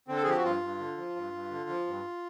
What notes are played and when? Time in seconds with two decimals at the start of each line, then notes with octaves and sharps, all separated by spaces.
0.08 D3 C4
0.16 A4
0.23 G#4
0.26 F3 G4
0.36 F#4
0.43 G2 F4
0.61 G2
0.79 D3
0.97 F3
1.16 G2
1.34 G2
1.51 D3
1.69 F3
1.87 G2